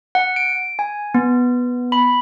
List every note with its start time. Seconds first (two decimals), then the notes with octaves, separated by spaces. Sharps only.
0.15 F#5
0.36 D7
0.79 G#5
1.14 B3
1.92 B5